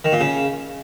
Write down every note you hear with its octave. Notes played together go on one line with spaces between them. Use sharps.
D#3
A#2
C#3